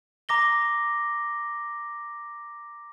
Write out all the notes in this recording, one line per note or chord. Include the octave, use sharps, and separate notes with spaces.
A#5 D6 A#6 G7